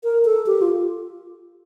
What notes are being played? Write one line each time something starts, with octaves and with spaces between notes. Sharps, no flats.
A#4
A4
G4
F4